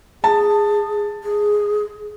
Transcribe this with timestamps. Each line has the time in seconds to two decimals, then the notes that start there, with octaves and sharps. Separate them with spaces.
0.24 G#4 A5
1.24 G#4